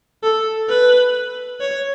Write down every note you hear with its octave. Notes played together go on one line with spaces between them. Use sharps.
A4
B4
C#5